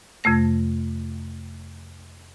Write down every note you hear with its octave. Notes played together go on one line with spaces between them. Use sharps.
F2 C3 A3 A#6